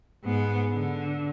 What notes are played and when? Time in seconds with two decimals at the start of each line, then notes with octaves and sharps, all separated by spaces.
0.24 G#2 B3
0.73 D3